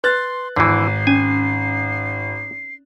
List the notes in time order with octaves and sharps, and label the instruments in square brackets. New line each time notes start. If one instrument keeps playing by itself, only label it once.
[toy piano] B4 [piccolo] C6 [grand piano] F#6 A6
[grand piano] G#1 [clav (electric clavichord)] D3 E3 [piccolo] C7
[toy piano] C#4 [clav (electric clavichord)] G#5